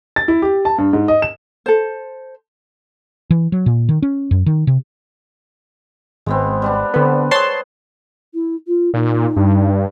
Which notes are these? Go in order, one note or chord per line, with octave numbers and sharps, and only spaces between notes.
A6
E4
G4
A5
G2
G#2
D#5
E7
A4 C5
E3
F#3
A#2
D#3
C#4
F#2
D#3
C3
G#1 G#3 B3 C4
G3 B3 D4
D3 B3 C4 B4
G#4 C#5 F#5 A5 C6
E4
F4
A#2 D#4
G2